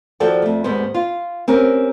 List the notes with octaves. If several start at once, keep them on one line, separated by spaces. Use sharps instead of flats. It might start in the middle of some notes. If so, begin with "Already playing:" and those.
D#2 F3 F#4 A4 D5 G5
F2 A3
D#2 G#2 B3 C5
F4
C4 C#4 G4 A#4